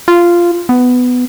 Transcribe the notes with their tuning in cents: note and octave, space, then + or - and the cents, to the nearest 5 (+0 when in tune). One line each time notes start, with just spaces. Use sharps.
F4 -10
B3 +10